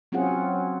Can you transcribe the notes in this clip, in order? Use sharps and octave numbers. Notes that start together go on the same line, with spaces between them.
F#3 C4 C#4 F4 G#4 F#5